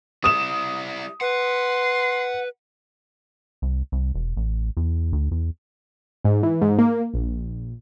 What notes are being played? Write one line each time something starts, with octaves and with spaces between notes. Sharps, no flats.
G3 E4 D#6 E7
B4 F#5 C6
C2
C2
E1
A1
E2
D2
E2
G#2
E3
G#2
A#3
A#1